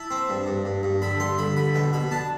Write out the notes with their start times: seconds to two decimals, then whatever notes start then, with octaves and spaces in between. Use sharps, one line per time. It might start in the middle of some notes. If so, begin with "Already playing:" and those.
Already playing: E4 A5
0.11 C4
0.29 G2
0.47 G2
0.65 G2
0.83 G2
1.02 D3 B5
1.20 G2 C6
1.38 D3 B5
1.56 D3 B5
1.75 B2 G5
1.93 B2 B5
2.11 D4 A5